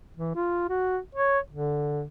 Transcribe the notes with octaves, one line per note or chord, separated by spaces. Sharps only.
E3
F4
F#4
C#5
D3